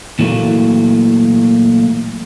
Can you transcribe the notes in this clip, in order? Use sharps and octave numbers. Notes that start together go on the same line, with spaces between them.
A#2 E3 F#3 G3 A3 A#3